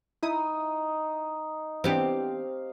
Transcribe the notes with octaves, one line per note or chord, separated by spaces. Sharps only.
D#4 E4 D#6
E3 B3 C4 D4 G4 F5